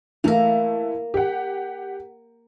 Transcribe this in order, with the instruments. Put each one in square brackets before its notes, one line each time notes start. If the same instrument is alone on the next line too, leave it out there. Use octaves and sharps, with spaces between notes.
[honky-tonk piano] E3 A3 E4 [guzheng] A#3 A#4
[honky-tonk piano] G4 F#5